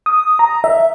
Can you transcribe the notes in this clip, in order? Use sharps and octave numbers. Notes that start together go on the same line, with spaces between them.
D#6
A#5
E5